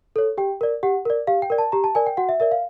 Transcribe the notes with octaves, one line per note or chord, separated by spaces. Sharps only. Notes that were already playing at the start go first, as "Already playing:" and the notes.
A4 C#5
G4 G5
A#4 D5
G4 F#5
A#4 D5
G4 F5
G5
A#4 D5
A5
G4 A#5
A5
A#4 D5 G#5
G5
F#4 F#5
E5
A#4 D5 E5
F5